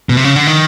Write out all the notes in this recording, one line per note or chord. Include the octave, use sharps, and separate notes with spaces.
B2
C3
C#3
D3
D#3